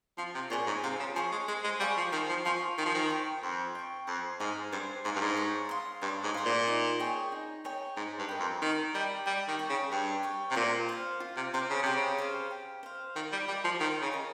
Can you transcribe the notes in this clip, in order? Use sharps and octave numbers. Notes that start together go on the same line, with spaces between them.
F3 F4
C3
A#2 G#4 C#5
G#2
C3 F4
C#3
F3 G#4 C#5
G#3
G#3 C5
G#3
G3 F5 G#5 C#6
F3
D#3 C5
F3
F3 F5 G#5 C#6
D#3 C5
F3
D#3
G5 C#6
F2 C5
G5 C#6
F2 C5
G#2 F5 G#5
G2 C5
G#2 F5 G#5
G2
G#2
C#5
F5 C6 D#6
G2 C#5
G#2
F5 C6 D#6
A#2
D#4
G#4 C#5 G5
D#4
G#4 C#5 G5
G#2 D#4
G2
A#4 D#5 G5
F2
D#3 D#4
G3 A#4 D#5 G5
G3 G4
D#3
C#5 G5
C#3
G2 G4
C#5 G5
C3
A#2 F4
C5 F5
F4
C3
C3 C5 F5
C#3
C3 G4
C#3
C5 F5
G4
C5 F5
D#3 F4
G3
G3 A#4 D#5
F3
D#3 F4
C#3
A#4 D#5